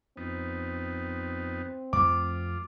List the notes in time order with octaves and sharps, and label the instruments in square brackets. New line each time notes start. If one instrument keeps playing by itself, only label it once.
[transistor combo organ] F2 B3 D#4 [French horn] C4
[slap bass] F2 A3 [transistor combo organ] F4 [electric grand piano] D6